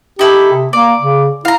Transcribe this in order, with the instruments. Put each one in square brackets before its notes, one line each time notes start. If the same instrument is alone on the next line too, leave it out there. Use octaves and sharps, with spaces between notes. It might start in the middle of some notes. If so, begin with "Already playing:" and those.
[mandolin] D#4 E4 A4 [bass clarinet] G4
[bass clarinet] C3
[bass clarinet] A#3 [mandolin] D5
[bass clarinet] C#3
[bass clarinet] E4 [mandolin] F5 A#5